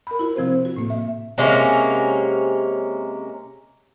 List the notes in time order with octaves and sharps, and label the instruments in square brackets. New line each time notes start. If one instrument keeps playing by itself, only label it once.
[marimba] A#4 B5
E4 F#4
C3 F3 C4 F#4 C5
F#4
A2 A#3
E5
[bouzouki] C3 G#3 A#3 C#4